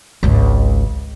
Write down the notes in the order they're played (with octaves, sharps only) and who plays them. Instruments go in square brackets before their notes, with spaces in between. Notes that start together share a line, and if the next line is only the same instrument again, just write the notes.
[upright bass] G#1 C#2